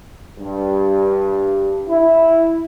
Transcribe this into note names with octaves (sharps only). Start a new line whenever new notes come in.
G2
E4